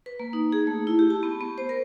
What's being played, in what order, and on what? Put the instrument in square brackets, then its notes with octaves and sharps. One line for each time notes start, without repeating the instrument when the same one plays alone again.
[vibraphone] B4
A#3
D#4
G#4
A3
E4
G4
A5
B3
B3
C5
A#4